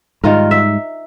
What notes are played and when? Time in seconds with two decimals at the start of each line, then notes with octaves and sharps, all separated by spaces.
0.24 G#2 D#3 G3 F4 A#4
0.51 E5